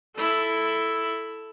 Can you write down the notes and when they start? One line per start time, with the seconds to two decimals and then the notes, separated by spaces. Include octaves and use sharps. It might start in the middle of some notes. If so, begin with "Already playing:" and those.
0.16 E4 A4